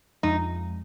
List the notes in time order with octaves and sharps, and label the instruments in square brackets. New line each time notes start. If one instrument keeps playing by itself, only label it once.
[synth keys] F2 F3 G#3 [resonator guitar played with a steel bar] D#4